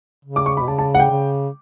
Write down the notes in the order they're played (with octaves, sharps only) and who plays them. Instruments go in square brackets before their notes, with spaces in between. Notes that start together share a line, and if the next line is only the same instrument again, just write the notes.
[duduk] C#3
[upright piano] D6
C#6
B5
[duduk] B2
[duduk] C#3 [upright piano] A5
[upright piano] A5
F#5
G5
[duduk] C#3